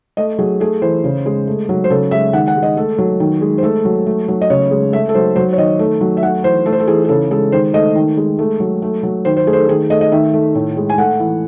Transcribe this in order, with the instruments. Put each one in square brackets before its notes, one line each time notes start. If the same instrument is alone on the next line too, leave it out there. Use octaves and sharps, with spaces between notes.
[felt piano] A3 D#5
F#3 G#4
A3 G#4
E3 C5
C#3
G#3
A3
F#3
C5
C#3 A4
G#3 E5
D#3 F#5
F#5
G#3
D#5
A3 A4
F#3
D#3
G#3
C5
A3 A4
F#3
A3
F#3
D#5
C#3 C#5
G#3
A3 E5
A4
F#3 C5
F#3 C5
C#5
D#3 D#5
A3
F#3
E5
A3 F#5
E3 C5
A3 A4
C5
A4
E3 G#4
G#4
C#3 A4
G#3 A4
D#3 C5
A3 D#5
D#3
G#3
A3
F#3
A3
F#3
D#3 C5
C5
A3 G#4
C5
A4
D#3 G#4
A3 D#5
D#5
D#3 E5
A3
A2
G#3
G#5
A3 F#5
E3